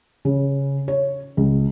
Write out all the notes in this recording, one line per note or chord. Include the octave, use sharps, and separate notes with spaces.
C#3
C#5
C#2